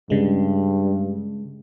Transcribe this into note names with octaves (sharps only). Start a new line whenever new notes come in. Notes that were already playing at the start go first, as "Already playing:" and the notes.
G2 C#3 G#3